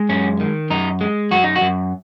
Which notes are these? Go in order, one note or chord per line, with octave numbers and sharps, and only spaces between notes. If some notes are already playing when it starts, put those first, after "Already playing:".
Already playing: G#3
F#2 C#4
D#3
F#2 D#4
G#3
F#2 F#4
D#4
F#4
F#2